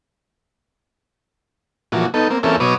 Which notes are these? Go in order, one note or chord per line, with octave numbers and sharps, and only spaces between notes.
A#2 E3 F3 F#4
B3 D#4 A4
A#3 C4
E2 A#3 C4 C#4 E4 A4
B2 F#3 B4 C#5 D6 D#6